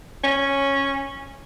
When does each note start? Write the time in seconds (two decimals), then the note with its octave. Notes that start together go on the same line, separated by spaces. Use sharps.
0.24 C#4